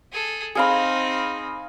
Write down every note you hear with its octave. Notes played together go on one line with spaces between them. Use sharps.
G#4 A4
C4 D#4 G#4 F5 B5